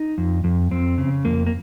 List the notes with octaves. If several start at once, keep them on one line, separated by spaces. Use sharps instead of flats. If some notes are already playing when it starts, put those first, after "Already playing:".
Already playing: D#4
F2
F2
F2 C4
C#3
F2 A#3
A#3